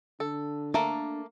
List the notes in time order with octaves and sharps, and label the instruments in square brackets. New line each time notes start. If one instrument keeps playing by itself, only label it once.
[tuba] D3 [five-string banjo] A4
[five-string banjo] A3 A#3 [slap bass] D4